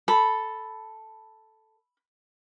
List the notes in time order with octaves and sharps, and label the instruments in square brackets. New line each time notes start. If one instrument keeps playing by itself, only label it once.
[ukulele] A4 [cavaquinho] B5